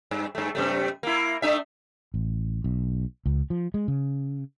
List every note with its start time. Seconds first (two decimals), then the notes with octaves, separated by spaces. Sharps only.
0.11 G2
0.35 G2 A3
0.55 F#2 C3 A3
1.03 A#3 E4
1.42 A3 D4 E5
2.14 A1
2.64 B1
3.26 C#2
3.50 F3
3.74 G#3
3.88 C#3